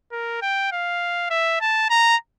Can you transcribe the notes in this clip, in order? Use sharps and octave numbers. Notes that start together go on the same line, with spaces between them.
A#4
G5
F5
E5
A5
A#5